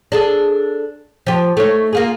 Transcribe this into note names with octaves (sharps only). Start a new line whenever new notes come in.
D4 G#4 A4
F3 G4
A3 D#4 C#5
A#3 F4 G#4